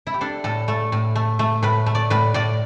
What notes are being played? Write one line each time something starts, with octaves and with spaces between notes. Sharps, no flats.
E4
G4
D4 A4
A2 A4
A3 A4
A2
A3
A3
A2 B4
A3
D5
A2 B4
A2 D5